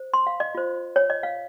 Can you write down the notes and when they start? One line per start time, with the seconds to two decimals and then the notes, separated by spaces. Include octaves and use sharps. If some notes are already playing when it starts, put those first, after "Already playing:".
Already playing: C5
0.14 C6
0.27 F5
0.40 D#5
0.55 F4 C5
0.96 C#5
1.10 D#5
1.23 F5